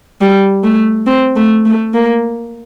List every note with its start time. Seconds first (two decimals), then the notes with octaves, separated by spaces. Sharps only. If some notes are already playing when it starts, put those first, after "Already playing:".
0.21 G3
0.64 A3
1.07 C4
1.36 A3
1.65 A3
1.94 A#3